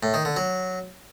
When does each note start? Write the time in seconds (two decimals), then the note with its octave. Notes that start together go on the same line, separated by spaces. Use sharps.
0.03 A2
0.14 D#3
0.25 D3
0.36 F#3